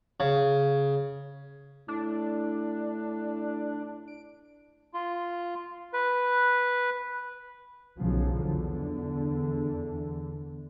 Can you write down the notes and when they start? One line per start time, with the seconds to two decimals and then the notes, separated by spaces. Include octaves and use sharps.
0.20 C#3
1.88 A2 D4
4.08 D7
4.94 F4
5.93 B4
7.98 B1 C#3 F3 F#3
8.41 E2 D3